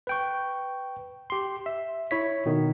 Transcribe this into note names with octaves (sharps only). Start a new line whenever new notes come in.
B4 G5 C#6
G4 C6
E5
E4 C#5 B6
B2 D#3